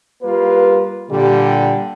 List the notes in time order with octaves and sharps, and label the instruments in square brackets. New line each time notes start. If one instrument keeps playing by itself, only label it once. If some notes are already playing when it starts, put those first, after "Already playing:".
[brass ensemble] G3 A#3 F4 B4
A#2 D3 G3